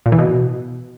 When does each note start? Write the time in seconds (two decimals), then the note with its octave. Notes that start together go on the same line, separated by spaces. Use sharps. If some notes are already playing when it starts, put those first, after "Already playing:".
0.06 A#2
0.12 E3
0.19 B2